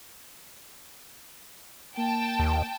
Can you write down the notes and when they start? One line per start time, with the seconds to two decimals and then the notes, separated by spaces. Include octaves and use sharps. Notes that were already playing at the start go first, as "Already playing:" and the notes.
1.97 A#3 G5 A5
2.40 D#2